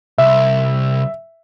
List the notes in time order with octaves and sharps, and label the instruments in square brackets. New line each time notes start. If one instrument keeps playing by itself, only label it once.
[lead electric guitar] C2 [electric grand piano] E5